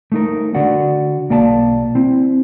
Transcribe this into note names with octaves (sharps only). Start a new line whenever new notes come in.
A3 D#4 A#4
D3 F#4 D5 F#5
B1 A#3 D5 G5 A5
C4 E4